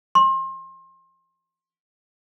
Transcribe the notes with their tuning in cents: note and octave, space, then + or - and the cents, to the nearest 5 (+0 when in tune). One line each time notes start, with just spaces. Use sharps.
C6 +30